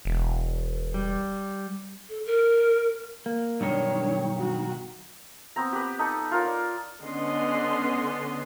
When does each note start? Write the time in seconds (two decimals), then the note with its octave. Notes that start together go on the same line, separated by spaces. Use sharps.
0.05 E1
0.94 G3
2.09 A4
2.26 A#4
3.26 A#3
3.61 B1 G2 D#3 D4 C#5
4.39 F#4
5.56 B3 C4 A#5
5.73 G4 B4
5.99 D#4 A4 G#5 C#6
6.31 F4 A#4 C#5
6.45 D5
7.04 D3 B3 C#4 D#5 C6